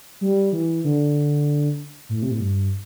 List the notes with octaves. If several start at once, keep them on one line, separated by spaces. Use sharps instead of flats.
G3
E3
D3
A2
C3
A2
G2